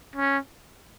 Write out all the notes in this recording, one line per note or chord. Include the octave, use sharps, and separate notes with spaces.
C#4